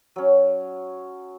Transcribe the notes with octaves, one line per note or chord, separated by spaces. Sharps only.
F#3 C#4